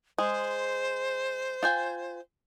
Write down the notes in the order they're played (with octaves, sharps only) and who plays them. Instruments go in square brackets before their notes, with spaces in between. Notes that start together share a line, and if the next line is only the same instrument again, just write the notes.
[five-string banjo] G#3 [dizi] C5
[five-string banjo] F4 G5 G#5